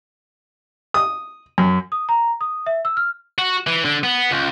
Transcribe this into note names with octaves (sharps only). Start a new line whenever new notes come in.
D#6
F#2
D#6
A#5
D#6
E5
E6
F6
F#4
E3
D3
B3
C#2